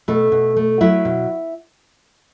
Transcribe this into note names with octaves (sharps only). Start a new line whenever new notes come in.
B2 A3 A4
B2
A3
F#3 E4 E5
B2